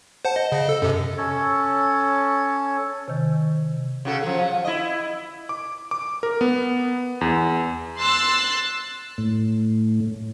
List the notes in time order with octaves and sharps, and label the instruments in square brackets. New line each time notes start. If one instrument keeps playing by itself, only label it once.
[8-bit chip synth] C5 F#5 A5
D#5
C#3 D#5
A4
F#2 C3
[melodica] C#4 A4 C#5
[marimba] C3 D#3
[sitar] C#3 F#4 A4
F3 F#3
E4 D#5
[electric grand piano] D6
D6
A#4
B3
E2
[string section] C6 E6 F#6 A6 C7
[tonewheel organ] A2